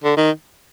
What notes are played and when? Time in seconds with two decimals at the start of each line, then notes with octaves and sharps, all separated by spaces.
0.04 D3
0.17 D#3